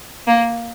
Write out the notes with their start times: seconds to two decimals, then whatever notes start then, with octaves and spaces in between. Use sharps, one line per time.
0.27 A#3